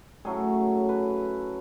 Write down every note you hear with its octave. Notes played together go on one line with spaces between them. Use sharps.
A2 F#3 A3 C#4 G#4
B4